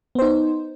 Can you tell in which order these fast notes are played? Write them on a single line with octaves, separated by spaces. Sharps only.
B3 C5 D#4